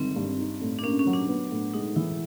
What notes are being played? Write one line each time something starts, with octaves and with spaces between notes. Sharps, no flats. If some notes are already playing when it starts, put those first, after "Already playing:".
Already playing: G1 D#3 G#3 C4
G2
D#4
A2
D4
A#3 C#4
C#4
F#3
D4
B3
A2
G#3 D#4
E3 E4